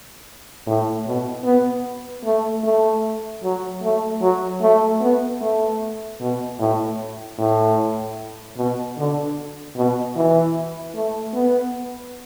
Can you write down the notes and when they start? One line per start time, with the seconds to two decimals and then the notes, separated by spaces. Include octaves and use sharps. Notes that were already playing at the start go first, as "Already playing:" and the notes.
0.67 A2
1.06 B2
1.45 B3
2.24 A3
2.64 A3
3.43 F#3
3.83 A3
4.22 F#3
4.62 A3
5.01 B3
5.41 A3
6.20 B2
6.59 A2
7.39 A2
8.57 B2
8.97 D3
9.76 B2
10.16 E3
10.95 A3
11.34 B3